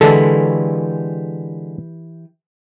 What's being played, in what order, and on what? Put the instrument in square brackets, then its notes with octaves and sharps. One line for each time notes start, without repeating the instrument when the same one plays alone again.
[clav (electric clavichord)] D3 G#3 [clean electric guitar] E3 G4 B4 [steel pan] A4